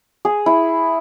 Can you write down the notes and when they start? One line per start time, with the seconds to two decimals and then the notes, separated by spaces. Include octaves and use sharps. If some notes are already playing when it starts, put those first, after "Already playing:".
0.25 G#4
0.46 E4